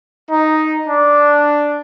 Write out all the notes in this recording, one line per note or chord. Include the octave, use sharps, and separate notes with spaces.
D#4
D4